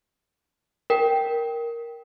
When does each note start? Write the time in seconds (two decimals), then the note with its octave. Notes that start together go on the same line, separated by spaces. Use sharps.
0.90 A#4 G5